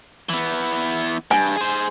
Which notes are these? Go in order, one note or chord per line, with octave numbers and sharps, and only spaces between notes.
E3 B3
G2 G#5
G#4 C5